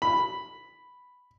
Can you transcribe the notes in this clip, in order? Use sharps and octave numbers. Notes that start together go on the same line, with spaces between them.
B5